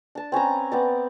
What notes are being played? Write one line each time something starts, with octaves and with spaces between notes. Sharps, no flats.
D4 A5
C4 C#4 B4 A#5
B3 C4 D5